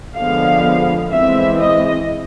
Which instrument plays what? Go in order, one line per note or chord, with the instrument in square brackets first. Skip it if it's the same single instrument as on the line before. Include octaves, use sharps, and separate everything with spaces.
[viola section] D3 F3 G#3 B3 F5
E3 G#3 C4 E5
D#5